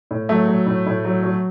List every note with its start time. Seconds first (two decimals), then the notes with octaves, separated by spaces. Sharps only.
0.11 A2
0.29 F#3 A3
0.48 F#3
0.66 A2
0.87 A2
1.05 F#3
1.23 F#3